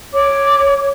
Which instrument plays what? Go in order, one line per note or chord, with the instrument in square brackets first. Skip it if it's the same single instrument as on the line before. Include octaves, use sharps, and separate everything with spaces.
[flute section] C#5 D6